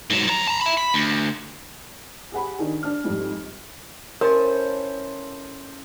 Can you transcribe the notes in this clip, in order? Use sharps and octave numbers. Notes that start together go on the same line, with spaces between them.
G#2 F#3
F2 A#5
A5 A#5
E5 B5
B5
D2
G4 G#4 F#5 B5
D#3 D4 G#4
D4 F6
F2 G#2 G3
C#4 E4 A4 A#4 C5 D5